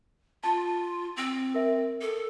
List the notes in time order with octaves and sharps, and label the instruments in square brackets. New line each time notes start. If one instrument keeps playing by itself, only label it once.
[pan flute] F4 [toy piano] A5
[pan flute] C4
[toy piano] A#4 E5
[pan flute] A4